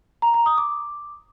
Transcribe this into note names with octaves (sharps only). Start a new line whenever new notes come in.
A#5
A#5
D#6
D6